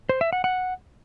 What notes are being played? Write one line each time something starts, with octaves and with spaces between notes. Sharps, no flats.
C5
E5
F#5
F#5